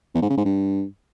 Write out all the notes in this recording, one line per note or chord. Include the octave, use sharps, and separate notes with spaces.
E2
G#2
C#3
G#2
G2